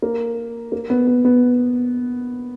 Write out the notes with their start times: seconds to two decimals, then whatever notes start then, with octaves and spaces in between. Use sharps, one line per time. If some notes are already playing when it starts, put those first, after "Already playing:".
0.02 A#3
0.72 A#3
0.90 B3
1.07 B3
1.25 B3